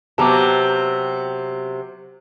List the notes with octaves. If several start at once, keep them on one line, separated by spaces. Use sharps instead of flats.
C3 F#3 B3 G4 A5 A#5 D6